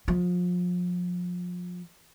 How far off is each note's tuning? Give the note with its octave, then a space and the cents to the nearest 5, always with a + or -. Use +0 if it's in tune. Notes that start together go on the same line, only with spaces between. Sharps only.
F3 +30